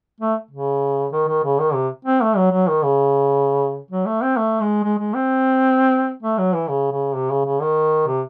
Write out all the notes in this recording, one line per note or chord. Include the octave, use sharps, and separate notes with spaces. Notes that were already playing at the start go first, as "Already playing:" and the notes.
A3
C#3
D#3
D#3
C#3
D#3
C3
C4
A3
F#3
F#3
D#3
C#3
F#3
A3
C4
A3
G#3
G#3
G#3
C4
A3
F#3
E3
C#3
C#3
C3
C#3
C#3
D#3
C3